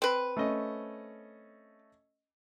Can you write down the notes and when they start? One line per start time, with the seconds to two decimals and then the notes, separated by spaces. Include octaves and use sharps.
0.02 C4 B4
0.37 A3 C#4 D#5